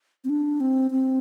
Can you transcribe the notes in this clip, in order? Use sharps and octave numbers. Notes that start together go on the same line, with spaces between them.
C4
D4
C4
C4